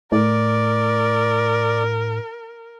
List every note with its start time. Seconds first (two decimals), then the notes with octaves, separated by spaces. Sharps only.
0.12 A2 A#4 D5